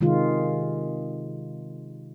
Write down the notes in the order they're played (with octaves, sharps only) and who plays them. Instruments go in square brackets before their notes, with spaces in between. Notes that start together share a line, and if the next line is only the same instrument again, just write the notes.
[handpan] C3 D#3 G#3 F4